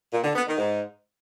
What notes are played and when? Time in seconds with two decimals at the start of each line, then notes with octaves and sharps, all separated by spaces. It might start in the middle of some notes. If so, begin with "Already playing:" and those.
0.13 A#2
0.24 D3
0.35 B3
0.47 D#3
0.58 G#2